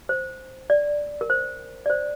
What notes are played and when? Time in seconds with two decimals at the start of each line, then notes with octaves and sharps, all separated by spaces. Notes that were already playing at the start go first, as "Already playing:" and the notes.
0.09 C5
0.70 D5
1.21 A#4
1.30 C5
1.86 D5
1.90 C5